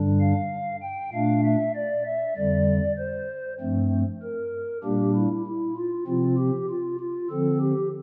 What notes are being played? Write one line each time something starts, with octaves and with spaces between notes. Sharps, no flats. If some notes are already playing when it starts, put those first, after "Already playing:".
Already playing: G2 D3 G3 D4
F5
G5
A#2 A3 D4 F5
E5
D5
E5
F2 D3 G3 D5
C5
G2 F3 A3 C4
A#4
A#2 G3 A#3 D4 G4
E4
E4
F4
C3 F3 C4 F4
G4
F4
F4
D3 F3 C4 A4
G4